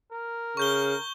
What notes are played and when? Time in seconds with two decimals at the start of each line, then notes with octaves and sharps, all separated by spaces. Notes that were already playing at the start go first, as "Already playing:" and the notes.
0.12 A#4
0.57 C#3 C#6 G6 G7